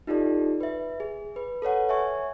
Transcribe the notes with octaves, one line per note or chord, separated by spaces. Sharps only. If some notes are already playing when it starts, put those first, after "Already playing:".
D#4 F4 G4 A4 D5
B4 E5
G#4
B4
A4 B4 C#5 F#5
C#5 E5 G#5 C#6